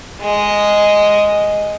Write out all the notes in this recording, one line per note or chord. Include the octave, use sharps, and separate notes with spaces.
G#3 D#5